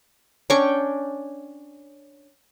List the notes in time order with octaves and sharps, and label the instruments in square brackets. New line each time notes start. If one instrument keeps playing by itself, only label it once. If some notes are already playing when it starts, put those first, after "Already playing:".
[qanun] C#4 D4 G5 C#6